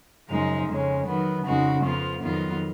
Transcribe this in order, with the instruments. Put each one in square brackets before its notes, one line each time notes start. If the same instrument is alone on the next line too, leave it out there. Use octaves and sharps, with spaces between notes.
[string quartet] F#2 C#3 F3 G#3 D#4
F2 C#3 G#3 C#4
D#3 F#3 B3
F2 C#3 G#3 D#4 F#4
F2 F3 B3 F4
F2 D#3 F#3 B3 F4